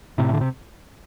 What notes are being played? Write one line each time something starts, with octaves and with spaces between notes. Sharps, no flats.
A2 C3
D3
C3